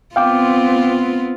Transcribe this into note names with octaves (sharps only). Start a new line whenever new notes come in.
B3 C4 F4 F5 G5 D6